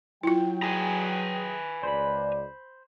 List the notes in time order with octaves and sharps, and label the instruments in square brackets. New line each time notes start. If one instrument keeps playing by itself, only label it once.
[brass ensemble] F#3 G5 [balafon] E4 F4
[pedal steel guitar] G#4 [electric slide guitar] B4 G#5 A#5
[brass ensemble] C#2 D5 [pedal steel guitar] C5 B5